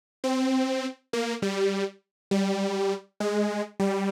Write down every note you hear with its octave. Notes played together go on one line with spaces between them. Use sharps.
C4
A#3
G3
G3
G#3
G3